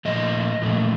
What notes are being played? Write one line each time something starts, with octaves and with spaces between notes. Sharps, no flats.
A#2 F3 A3 D#5
A#2 F3 A3